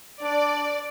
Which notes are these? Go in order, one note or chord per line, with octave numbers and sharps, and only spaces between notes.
D4 D5